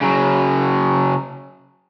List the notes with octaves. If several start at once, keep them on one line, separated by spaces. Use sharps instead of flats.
C#3 F#3